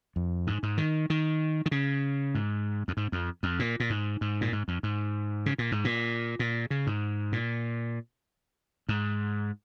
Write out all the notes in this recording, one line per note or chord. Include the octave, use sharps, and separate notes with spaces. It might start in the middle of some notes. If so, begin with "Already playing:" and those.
F2
G#2
G#2
D#3
D#3
D#3
C#3
G#2
F2
G#2
F2
F2
A#2
A#2
G#2
G#2
A#2
G#2
F2
G#2
C#3
A#2
G#2
A#2
A#2
C#3
G#2
A#2
G#2